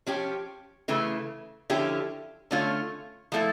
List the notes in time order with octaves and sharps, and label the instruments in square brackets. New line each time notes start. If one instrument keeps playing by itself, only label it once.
[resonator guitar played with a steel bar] F3 C#4 G4
C#3 E3 A3
D3 F3 C#4 E4 G4
D3 A3 C#4 F4
F3 A3 E4 A4